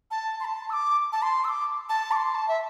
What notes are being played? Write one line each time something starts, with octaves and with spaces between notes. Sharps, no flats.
A5
C6
A5
E6
D6
A5
C6
E6
D6
A5
D6
C6
A5
E5